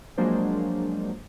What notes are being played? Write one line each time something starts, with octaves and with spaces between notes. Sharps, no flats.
F3 F#3 G#3 A#3 D4 C5